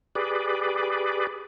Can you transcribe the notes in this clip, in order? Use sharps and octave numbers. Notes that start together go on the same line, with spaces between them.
G4 G#4 B4 D5